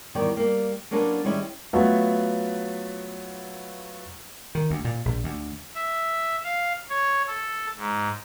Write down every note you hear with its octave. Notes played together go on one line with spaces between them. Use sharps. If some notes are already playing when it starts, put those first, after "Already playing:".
E2 D#3 G3 C#5 D5 G5
G3 A#3
F#3 A#3 C#4 D4 A4 B4
D#3 G3 G#3 C#4 E4
F#3 A3 B3 F4
D#3
D2
A#2
A#1
D2
E5
F5
C#5
A4
G#2